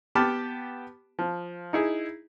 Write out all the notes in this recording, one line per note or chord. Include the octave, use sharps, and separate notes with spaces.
B3 G4 A5 B5 D6 F6
F3
D#4 E4 G#4